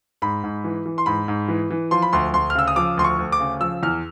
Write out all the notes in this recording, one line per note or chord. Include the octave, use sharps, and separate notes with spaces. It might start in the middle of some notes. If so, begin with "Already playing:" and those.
G#2 B5
G#2
E3
E3
C6
G#2 B5
G#2
E3
E3
F3 C6
B5
D2 C6
D2 C6
F6
C#3 E6
D#6
F3 D6
D2 C6
C#6
D2
D6
C#3
F3 E6
E2 F6